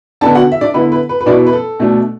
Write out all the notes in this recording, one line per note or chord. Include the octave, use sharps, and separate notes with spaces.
D3 B3 D4 A4 A5
F#4 F#5
E5
D4 D5
D3 B3 E4 B4
B4
B4
B4
B2 B3 D4 E4 D5
B4
A4
B2 A3 D4